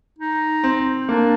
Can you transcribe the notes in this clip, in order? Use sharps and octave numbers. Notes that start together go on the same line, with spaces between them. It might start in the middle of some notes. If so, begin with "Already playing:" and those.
D#4
C4
A#3 D4